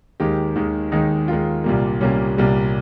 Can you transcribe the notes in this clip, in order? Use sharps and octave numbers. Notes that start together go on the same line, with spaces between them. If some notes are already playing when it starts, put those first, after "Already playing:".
D#2 D#3 G#3 G4
D#2 D#3 G#3
D#2 D#3 G#3 D#4
D#2 D#3 G#3 F4
C2 A#2 G3 A#3
C2 A#2 G3 A#3 C#4
C2 A#2 G3 A#3